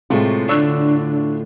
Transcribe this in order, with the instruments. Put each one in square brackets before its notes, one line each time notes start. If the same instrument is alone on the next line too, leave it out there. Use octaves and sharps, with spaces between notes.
[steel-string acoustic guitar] A2 A3 F4 [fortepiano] C3 G#3
[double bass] D3 [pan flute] D4 [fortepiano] D5 C#6 E6